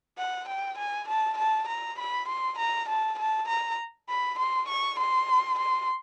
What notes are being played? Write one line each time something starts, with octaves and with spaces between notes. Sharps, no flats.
F#5
G5
G#5
A5
A5
A#5
B5
C6
A#5
A5
A5
A#5
B5
C6
C#6
C6
C6